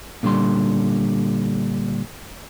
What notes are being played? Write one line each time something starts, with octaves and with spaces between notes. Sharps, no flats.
A#2 D3 G3 C6